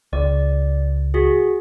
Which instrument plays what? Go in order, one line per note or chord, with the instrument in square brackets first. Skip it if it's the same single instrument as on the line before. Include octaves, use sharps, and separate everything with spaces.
[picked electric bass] C#2 [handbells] D5
[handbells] F#4 G#4